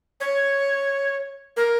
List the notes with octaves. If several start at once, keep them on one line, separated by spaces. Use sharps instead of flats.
C#5
A#4